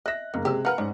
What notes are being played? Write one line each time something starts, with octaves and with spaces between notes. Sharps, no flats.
D#5 E5 F#6 A#6
F#1 D#3 A#3
C3 G#3 G4 E6
A#4 B4 F5 F#5 A#5 F6
G#2 C#4 D4